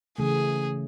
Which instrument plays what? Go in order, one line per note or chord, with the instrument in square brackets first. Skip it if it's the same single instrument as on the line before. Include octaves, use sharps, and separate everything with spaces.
[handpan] C#3 E3 A3 [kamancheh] G#4